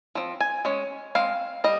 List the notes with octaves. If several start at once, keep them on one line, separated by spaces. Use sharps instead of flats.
F3 C4
G#5
G#3 C#4
G#3 C4 F5
G3 D#5